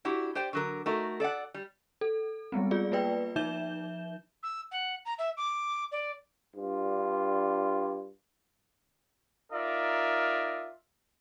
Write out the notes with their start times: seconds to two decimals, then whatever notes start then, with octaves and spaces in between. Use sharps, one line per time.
0.05 D4 E4 F#4 G4
0.35 G4 C5 D5 G5
0.53 D3 F#3 A#4
0.86 A3 D#4 F#4 A#4
1.20 A4 D5 E5 F#5
1.54 G3
2.01 A4
2.52 G3 G#3 B3 C4
2.71 F4 G#4 D5
2.92 A#3 F4 B4 D5 G5
3.36 F3 D#4 E5 G6 E7 G7
4.43 E6
4.71 F#5
5.06 A#5
5.19 E5
5.37 D6
5.92 D5
6.55 G2 D4 F4
9.52 D#4 F4 A#4 D5 E5